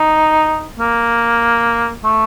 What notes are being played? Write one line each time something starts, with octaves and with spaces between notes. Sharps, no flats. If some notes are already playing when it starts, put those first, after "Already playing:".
Already playing: D#4
A#3
A3